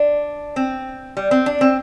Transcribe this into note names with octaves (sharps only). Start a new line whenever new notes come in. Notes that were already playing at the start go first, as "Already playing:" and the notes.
Already playing: D4
C4
G3
C4
D4
C4